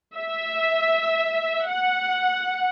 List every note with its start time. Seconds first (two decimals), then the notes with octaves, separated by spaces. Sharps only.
0.16 E5
1.71 F#5